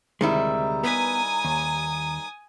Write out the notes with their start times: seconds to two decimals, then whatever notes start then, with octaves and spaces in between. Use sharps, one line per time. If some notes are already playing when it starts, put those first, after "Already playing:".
0.21 D2 C3 D#3 G3 G#3 E4 A#5
0.83 B3 B4 G#5 D#6
1.45 D#2